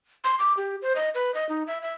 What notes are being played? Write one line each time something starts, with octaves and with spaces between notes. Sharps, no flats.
C6
D6
G4
C5
D#5
B4
D#5
D#4
E5
E5